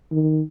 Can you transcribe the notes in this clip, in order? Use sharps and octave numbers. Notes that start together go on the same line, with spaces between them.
D#3